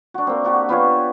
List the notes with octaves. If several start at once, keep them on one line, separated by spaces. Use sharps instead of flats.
D4 F#4
A#3 C4
D4 F#4 G4
B3 F4 G4 C#5